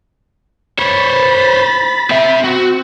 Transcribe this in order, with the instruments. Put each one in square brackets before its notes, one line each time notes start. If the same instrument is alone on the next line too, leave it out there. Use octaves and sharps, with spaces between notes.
[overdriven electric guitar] C5 C#5 [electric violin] B5 A6
[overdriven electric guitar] C4 E5
[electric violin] C4 [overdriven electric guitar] F#4